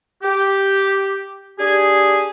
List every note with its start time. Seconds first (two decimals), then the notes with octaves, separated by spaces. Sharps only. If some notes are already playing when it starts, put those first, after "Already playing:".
0.22 G4
1.59 D4 G4 G#4